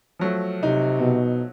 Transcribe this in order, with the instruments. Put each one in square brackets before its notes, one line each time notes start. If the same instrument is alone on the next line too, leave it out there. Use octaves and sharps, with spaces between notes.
[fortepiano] F3 F#3 A3
[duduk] C3 [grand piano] D#4
[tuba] B2